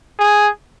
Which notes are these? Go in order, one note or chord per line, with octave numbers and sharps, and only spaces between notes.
G#4